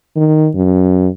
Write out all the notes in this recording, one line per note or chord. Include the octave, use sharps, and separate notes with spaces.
D#3
F#2